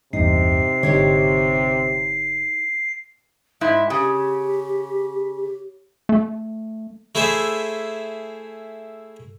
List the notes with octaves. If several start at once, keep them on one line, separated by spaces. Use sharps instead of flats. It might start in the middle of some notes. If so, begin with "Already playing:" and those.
A1 E2 G2 C3 D#4 C7
G#1 D3 D#4 G4 C#5
G#2 E4 E5
C#3 G4
A3
A3 E4 G#4 C5 E5